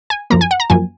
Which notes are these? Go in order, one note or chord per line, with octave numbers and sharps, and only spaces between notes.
G#5
F#2 F3 A#3 A#5
G#5
F#5
A#5
F#2 F3 A#3 G#5